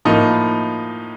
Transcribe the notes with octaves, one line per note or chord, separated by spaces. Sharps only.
A2 F3 A#3 D#4